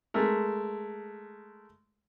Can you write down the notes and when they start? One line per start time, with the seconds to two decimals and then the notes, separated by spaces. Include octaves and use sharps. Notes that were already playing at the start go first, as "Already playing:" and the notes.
0.14 G#3 A3 A#4